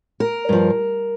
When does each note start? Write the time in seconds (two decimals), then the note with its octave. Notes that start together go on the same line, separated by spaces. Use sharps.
0.20 A#4
0.49 G2 F3